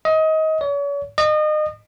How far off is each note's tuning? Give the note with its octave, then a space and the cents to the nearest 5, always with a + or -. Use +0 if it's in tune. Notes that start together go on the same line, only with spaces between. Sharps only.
D#5 +25
C#5 +40
D#5 -30